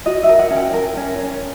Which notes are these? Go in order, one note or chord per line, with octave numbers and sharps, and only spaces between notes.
F#4 D#5
E5
A#4
F#5
C#4
G5
A#4
C#4
C#4